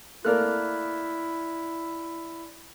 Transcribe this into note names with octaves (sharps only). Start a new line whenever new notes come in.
A3 A#3 E4 A#4 D5 F6 F#6